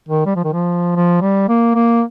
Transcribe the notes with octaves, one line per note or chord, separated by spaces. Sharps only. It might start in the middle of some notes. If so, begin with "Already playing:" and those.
D#3
G3
F3
D#3
F3
F3
G3
A#3
A#3